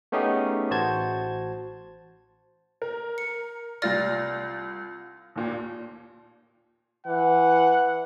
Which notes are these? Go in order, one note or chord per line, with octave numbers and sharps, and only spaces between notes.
A3 B3 C#4 D#4 G4 G#4
A1 F#4 C5 A5 G#6
A#4
C#7
C2 F4 D5 F6 A6 A#6
D#2 A#2
E3 F#5